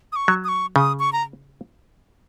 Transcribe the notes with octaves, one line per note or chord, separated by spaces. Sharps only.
D#6
C#6
F#3
D#6
C#6
C#3 D#6
C#6
A#5